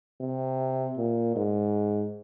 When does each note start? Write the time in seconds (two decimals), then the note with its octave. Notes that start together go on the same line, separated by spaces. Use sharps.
0.21 C3
0.97 A#2
1.36 G#2